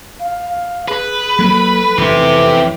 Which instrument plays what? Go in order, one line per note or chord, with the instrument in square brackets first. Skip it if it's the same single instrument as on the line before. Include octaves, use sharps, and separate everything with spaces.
[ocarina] F5
[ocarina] G#4 [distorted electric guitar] B4
[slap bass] F#3 A#3 [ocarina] A4
[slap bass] F1 E2 C3 [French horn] E3 [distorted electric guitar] C4 G4